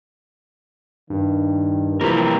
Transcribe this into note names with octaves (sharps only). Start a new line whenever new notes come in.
G2 D#3
G2 C3 E3 F3 A#3 A#4